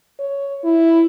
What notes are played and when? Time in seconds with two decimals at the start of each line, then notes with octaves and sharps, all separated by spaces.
0.19 C#5
0.64 E4